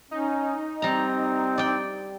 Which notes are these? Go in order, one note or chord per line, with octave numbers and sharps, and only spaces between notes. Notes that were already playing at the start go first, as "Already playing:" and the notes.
C#4 D#4
G3 C4 A#5
D5 G5